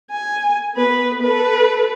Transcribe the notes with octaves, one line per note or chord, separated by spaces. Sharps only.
G#5
B3 B4
A4 B4